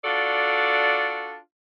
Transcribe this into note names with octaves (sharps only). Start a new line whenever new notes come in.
D4 F4 F#4 A4 D5